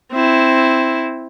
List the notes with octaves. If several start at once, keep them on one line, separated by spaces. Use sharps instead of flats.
C4 E4